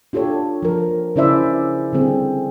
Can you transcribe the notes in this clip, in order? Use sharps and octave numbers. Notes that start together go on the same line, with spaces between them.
D4 F4 G4 A4 C#5
F3 A#4
C#3 C#4 E4 C5 D5 E5
D3 G3 C4 G#4